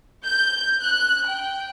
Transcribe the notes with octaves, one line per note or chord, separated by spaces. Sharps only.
G6
F#6
G5